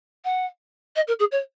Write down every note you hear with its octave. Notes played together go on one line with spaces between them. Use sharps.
F#5
D#5
A#4
G#4
C#5